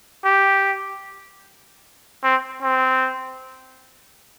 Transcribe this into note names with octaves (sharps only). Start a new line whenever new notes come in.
G4
C4
C4